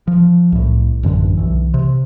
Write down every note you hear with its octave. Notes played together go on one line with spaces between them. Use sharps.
F3
C2 A2
A1 F#2 D3 E3
B1 E3
C3